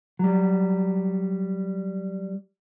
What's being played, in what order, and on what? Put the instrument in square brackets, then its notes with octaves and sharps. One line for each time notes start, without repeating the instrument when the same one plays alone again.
[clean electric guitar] F#3 G3